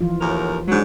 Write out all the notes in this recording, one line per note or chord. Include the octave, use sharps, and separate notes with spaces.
E3 F3 F4
D#2 A2 A#4
G#2 F#3 G#3 D4